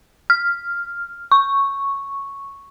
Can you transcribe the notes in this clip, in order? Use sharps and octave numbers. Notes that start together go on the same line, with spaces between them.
F6
C#6